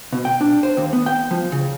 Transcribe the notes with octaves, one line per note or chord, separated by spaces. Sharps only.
B2
G5
D4
C5
D#2
B3
G5
F3
C#3